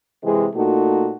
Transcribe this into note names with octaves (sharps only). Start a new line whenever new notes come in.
C3 E3 G#3
A#2 A3 D#4 F#4